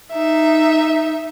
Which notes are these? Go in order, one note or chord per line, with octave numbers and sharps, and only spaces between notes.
D#4 E5